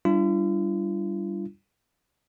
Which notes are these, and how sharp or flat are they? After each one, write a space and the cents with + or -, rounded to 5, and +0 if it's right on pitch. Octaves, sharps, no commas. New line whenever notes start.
G3 +0 D4 +0 F4 -45